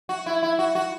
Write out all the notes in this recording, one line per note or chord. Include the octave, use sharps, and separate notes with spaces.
F#4
E4
E4
F#4
F#4